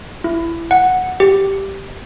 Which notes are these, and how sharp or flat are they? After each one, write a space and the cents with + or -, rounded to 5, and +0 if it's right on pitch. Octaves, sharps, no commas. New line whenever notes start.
E4 +20
F#5 -5
G4 -5